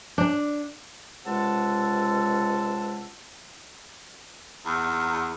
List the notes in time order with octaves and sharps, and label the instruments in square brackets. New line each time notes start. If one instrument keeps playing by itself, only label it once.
[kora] D4
[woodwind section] C#2 C3 G#3 F#5 A5 E6
[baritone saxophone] E2